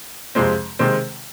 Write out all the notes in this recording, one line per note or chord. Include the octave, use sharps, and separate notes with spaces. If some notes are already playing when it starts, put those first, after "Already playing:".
F2 C3 F3 G#3 C4
C3 D#3 G#3 C4